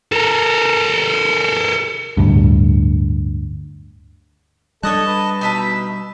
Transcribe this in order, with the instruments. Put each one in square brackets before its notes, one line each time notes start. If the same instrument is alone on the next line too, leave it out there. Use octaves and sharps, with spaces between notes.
[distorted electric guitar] A4 A#4
[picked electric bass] D1 D2 G2
[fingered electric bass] G3 D4 [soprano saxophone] A4 [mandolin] C#5 D#6 F#6 [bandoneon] D#5 A5
[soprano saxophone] B4
[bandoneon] B2 [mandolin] D#4 E5 A5